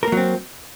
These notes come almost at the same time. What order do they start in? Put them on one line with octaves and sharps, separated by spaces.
A#4 A#3 F#3 C4